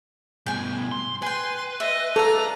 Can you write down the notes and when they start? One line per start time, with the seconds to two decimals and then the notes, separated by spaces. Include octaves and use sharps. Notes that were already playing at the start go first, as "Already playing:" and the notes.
0.46 G2 B2 G5 G#5
0.92 C6
1.22 B4 G5 G#5 C6
1.80 D#5 E5
2.16 A4 D5 F5 A#5